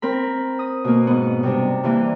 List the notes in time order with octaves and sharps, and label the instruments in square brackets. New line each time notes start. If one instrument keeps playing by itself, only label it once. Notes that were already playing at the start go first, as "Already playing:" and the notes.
[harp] C4 A#4 B5
D#6
B2 A#3
G#2 B3
C3 G3 D4
G2 E3 A#3